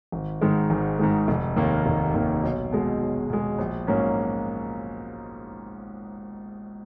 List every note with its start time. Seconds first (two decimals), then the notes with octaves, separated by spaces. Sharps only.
0.12 G#1
0.41 G#2 D#3 G#3
0.70 G#1
0.99 G#2 D#3 G#3
1.28 F1
1.57 D#2 D#3 A#3
1.86 F1
2.14 D#2 D#3 A#3
2.43 B1
2.72 B2 G#3
3.01 B1
3.30 B2 G#3
3.58 A#1
3.87 G#2 F#3 A#3 C#4